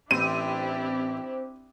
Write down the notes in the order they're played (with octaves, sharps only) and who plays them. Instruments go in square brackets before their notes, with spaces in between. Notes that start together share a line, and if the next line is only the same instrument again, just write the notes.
[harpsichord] A1 A2 [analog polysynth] C4 [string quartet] D4 E4 G4 [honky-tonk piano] D#7